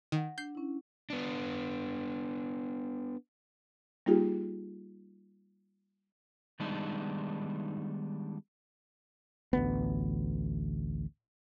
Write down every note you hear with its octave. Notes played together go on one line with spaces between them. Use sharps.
D#3 F#5 A#6
D4 G6 C7
C#4 E4
B3 D4
G3 A#3 D#4 F4 G4 G#4
D#3 G3 G#3 B3 D4 D#4
A1 D2 B3